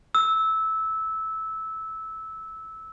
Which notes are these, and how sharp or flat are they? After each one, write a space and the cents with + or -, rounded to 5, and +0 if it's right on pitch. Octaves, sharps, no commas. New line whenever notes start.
E6 -15